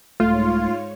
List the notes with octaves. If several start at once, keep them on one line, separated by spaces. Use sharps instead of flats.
C2 G#2 A3 F4 C#5